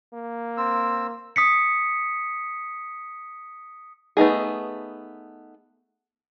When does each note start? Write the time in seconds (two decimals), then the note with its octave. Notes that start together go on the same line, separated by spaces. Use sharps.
0.14 A#3
0.57 C4 E6
1.36 D#6 B6 C#7
4.17 A3 B3 D#4 G#4